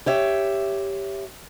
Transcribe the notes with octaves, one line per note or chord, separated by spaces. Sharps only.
G4 C#5 E5